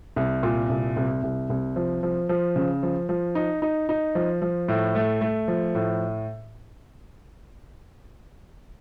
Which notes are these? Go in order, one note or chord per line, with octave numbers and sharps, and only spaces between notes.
C2
A#2
C2
C2
C2
C2
F3
F3
F3
C#3
F3
F3
D#4
D#4
D#4
F3
F3
A2
A3
A3
F3
A2